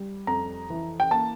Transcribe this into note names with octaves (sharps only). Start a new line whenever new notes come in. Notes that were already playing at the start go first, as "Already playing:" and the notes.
Already playing: G3
F2 A#5
E3
G5
A#3 A5